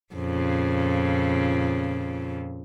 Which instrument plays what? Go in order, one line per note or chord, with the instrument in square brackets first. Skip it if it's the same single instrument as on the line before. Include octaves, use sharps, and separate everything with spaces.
[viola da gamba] F2 A#2 C#3